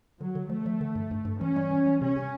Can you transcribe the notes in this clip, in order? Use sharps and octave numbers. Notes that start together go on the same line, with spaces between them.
D3 F#3
D3
F3 A3
F3
D3
G2
G2
G2
E3 C#4
G3
E3
G3
C3 C#4
C3